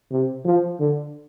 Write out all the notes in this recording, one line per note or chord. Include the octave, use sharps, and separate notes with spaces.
C3
F3
D3